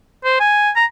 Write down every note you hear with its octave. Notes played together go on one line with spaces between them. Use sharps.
C5
G#5
A#5